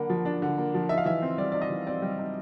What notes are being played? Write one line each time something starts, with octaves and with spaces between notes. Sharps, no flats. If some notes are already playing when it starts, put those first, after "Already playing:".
Already playing: D3 A#3 D4 F#5 B5
F3
D4
D3
A#3
F3
D#4 E5
F5
E3 E5
C4
G3 D5
D#4 D5
D#5
E3
C4 D5
G3
D#4